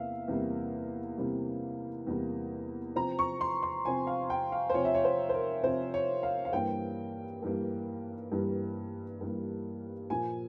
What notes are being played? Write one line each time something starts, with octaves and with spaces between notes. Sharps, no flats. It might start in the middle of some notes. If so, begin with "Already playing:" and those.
Already playing: E2 C3 A#3 E5 F5
E2 C3 G3 A#3
E2 C3 G3 A#3
E2 C3 G3 A#3
C3 F3 C4 A#5
C#6
C6
C6
C3 F3 C4 G#5
F5
G5
F5
C5
C3 F3 C4 C#5
E5
C#5
C5
C5
A#4
C3 F3 C4 C5
C#5
F5
F5
G2 E3 G3 A#3 G5
G2 E3 G3 A#3
G2 E3 G3 A#3
G2 E3 G3 A#3
A#2 F3 A#3 G#5